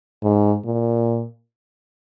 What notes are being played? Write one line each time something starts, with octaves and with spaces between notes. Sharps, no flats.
G#2
A#2